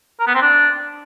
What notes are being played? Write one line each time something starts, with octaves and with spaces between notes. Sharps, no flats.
A#4
B3
C4
D4